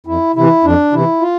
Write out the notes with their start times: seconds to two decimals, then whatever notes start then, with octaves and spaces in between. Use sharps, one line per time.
0.06 F2 E4
0.36 C3 E3 E4
0.64 F2 D4
0.92 C3 E3 E4
1.21 F4